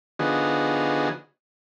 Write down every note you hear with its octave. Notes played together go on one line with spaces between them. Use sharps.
D3 F3 B3 D#4 F#4 G#4